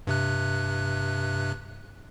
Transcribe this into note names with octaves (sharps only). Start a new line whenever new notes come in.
G2 C3 F#6